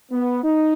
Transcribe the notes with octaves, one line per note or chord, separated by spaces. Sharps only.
B3
D#4